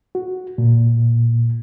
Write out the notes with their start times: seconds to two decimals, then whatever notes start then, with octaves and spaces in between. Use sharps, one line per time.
0.15 F#4
0.58 A#2